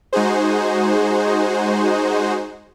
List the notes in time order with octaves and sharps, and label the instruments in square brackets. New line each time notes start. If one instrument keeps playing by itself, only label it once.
[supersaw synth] G#3 D#4 F#4 G#4 C5